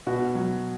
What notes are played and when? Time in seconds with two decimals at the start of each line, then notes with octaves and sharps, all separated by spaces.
0.07 B2 F#4
0.35 F#3